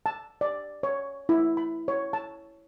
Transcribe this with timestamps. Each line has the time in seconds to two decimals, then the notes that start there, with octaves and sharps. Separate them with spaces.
0.06 A5
0.41 D5
0.83 C#5
1.29 E4
1.57 B5
1.88 C#5
2.13 A5